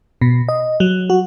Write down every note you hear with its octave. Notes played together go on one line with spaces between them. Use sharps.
B2
D#5
F#3
F#4